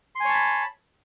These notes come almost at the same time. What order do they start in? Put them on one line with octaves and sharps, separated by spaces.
C6 G#5 C#5 A5 B5